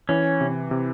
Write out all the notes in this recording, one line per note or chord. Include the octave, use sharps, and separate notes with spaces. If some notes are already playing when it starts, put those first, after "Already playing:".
E3 C#4
C3
C3